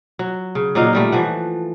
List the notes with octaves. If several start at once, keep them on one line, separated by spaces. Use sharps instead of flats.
F#3
C#3
A#2 F#3 D#4 F5
D#3 G3 A3
E3 F3 F#5